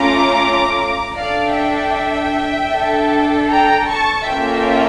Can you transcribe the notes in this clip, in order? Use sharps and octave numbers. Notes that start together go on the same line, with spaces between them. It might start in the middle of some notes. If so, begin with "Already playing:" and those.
Already playing: A3 C#4 F4 A#5 D6
D4 A4 D5 F5
E5 G5
D4 A4
G5 A#5
A5 C#6
A#3 C#4 F4 A4 E5 G5